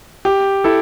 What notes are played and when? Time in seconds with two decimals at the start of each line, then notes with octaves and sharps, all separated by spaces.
0.25 G4
0.64 E4 A4